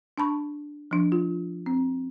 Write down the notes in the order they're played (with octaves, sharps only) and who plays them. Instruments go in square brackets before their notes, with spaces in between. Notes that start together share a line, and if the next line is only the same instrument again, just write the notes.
[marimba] D4 A5 B5 C#6
F3 D4
F4
C4